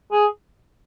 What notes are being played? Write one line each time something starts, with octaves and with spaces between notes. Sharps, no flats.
G#4